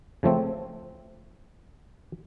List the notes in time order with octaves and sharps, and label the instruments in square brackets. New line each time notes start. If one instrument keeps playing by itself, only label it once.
[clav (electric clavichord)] C#3 F3 A3 C4